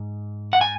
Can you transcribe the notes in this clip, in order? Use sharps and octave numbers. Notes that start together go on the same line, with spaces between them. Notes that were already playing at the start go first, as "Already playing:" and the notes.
Already playing: G#2
F#5
G#5